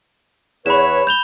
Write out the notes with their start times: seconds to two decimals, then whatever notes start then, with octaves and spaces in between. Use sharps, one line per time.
0.66 E2 B4 C#5 B5 E7
1.07 G6 F7 G7